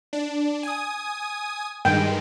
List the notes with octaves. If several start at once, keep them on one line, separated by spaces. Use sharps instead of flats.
D4
G#5 D#6
G2 D#3 G#3 G5